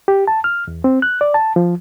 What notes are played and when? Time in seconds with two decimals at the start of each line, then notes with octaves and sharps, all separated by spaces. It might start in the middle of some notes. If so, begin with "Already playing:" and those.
0.08 G4
0.27 A5
0.44 F6
0.68 E2
0.84 C4
1.02 F#6
1.21 D5
1.34 A5
1.56 F3